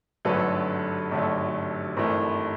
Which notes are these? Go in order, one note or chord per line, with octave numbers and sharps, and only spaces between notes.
G#1 G2 D3 F#3 A3 A4 B4
G#1 G2 D3 F#3 A3
G#1 G2 E3 A3 A#4 C5